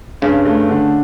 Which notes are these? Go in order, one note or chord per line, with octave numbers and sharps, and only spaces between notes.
G2 C#3
A3
D3